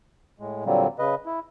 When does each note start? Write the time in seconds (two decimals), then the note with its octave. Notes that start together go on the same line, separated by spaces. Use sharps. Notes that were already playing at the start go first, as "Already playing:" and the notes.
0.39 A2 G#3
0.66 A#2 D3 F#3 G3 A#3 C4
0.99 C#3 B4 D#5
1.26 E4